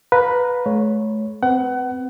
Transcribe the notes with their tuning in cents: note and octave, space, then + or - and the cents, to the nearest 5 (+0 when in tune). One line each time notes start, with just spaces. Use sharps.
B4 +0 F5 +35 A#5 +0
A3 -40 C#5 +0
C4 -20 B4 +0 F#5 +30